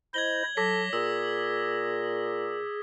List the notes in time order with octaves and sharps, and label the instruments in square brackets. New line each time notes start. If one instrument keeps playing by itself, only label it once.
[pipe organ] E4 C5 D#5 [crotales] G#6 F#7 G7
[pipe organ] F#3 [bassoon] A4 [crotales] D6 A#6 B6
[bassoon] A#2 [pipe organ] G#4 [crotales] E6